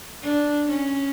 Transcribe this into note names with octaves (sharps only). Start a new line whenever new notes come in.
D4
C#4